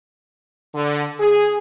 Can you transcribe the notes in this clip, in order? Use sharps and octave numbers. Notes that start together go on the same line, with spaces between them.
D3
G#4